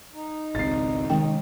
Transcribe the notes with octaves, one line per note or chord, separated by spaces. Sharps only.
D#4
G#1 C#2 C4 A6 C7
C3 D#3 G#3 G5